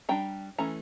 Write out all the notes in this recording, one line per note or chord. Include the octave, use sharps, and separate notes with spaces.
G3 D4 G5 A#5
E3 A3 C#4 A#5